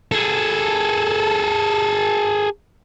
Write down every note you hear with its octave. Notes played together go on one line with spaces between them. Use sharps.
G#4 A4